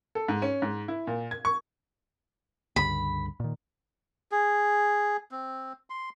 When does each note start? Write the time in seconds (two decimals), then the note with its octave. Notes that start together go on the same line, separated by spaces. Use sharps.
0.15 A4
0.28 G#2
0.42 C#4
0.62 G#2
0.88 E4
1.07 A#2
1.31 G#6
1.45 C#6
2.76 C#2 G2 D3 B5
3.40 A#2 D#3
4.32 G#4
5.31 C4
5.90 C6